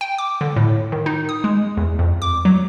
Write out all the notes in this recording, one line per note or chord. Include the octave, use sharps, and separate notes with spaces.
G5
D6
D3
A2
D#3
D#4
D#6
G#3
E2
F2
D6
F#3